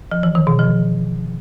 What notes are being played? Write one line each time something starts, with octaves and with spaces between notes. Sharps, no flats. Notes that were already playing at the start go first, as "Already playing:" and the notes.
F3
E3
D#3
B2
F3